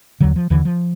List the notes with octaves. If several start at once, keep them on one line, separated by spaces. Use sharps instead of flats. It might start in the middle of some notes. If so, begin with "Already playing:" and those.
D#2 D3 F#3
F3
D#2 D3 E3
F3